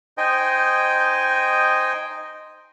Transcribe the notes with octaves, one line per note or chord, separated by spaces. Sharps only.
D#4 C5 D#5 G5 G#5